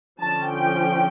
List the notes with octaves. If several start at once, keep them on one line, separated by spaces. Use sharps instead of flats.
D3 F3 C#4 A5
G5